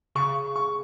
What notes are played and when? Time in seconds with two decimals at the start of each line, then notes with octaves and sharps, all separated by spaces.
0.15 C#3 C#6
0.56 C#6